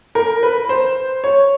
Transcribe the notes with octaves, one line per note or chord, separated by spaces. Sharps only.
A#4
B4
C5
C#5